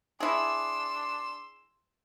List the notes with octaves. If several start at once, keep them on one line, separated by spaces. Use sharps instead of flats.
D4 E4 G#4 C6 E6